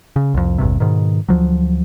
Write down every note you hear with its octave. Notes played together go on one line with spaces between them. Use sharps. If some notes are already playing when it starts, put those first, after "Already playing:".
C#3
C2 F2
A1 E2 G2 C3
G#2 B2 D#3
D2 F3 F#3